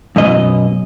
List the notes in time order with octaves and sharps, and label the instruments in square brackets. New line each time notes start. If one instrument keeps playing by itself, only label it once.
[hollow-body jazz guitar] F#2 B2 D#5